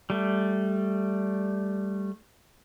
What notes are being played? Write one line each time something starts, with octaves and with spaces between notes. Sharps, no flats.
G3 A3